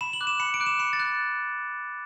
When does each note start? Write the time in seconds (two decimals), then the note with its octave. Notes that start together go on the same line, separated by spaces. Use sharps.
0.01 B5 E7
0.13 F#7
0.21 D6 F#6
0.27 E7
0.40 B5 C#7
0.54 D7
0.60 D6 F#6
0.66 E7
0.79 B5 C#7
0.93 A6
1.00 F#6